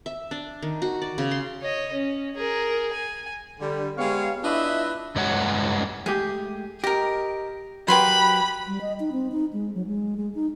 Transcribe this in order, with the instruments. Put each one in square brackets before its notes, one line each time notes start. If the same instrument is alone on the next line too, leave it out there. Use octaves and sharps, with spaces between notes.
[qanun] E5
D4
D#3
F#4
D5
C#3
C6
[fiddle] C#5 D#5
C#4
G#4 A#4
G#5
[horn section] D3 G3
G#3 B3 G4 C#5 F5
D4 E4 F4 B4 D#5 E5
[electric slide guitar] G2 G#3 C#5 F#5
[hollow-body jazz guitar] G#3 A3 G4 [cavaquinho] G#4
[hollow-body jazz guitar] G4 [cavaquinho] A#4 D#5
[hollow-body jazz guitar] F#3 A#4 [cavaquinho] G4 B4 C6 [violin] B5
[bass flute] G3
D#5
D#4
C4
D#4
G#3
F#3
G#3
G#3
D#4